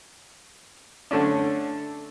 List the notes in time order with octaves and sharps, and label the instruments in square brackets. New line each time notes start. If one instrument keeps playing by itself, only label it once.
[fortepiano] D3 A3 C#4 D4